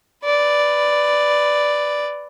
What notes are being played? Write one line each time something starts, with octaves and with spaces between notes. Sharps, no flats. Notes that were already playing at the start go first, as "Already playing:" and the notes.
B4 D5